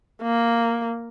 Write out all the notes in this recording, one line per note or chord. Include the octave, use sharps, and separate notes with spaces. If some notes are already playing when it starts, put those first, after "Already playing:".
A#3